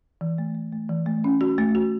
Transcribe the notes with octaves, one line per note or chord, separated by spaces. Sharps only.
E3
A3
A3
A3
E3
A3
C#4
F#4
A3
F#4